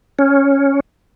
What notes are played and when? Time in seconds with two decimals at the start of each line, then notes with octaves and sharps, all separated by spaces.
0.19 C#4